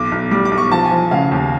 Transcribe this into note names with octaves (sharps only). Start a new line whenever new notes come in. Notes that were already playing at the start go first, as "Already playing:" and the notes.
Already playing: B1 D6
B1
G3 D6
D6
B1
C#6
F3 A5
G#5
F3
C#3 F5
D#2